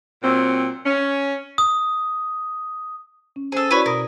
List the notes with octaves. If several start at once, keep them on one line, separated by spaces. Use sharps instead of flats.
A#2 F#3 C4
C#4
D#6
C#4
C#4 G#4 A4 C5
E4 F#4 B4 C#5 D5
B2 A#4 D#6